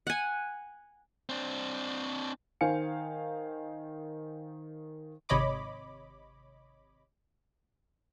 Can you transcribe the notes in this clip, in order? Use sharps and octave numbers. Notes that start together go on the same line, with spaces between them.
F#5 G#5
C4 D4
D#3 D#4 C5 F5 G#5 C#7
G#1 C3 C#5 D#5 B5 D6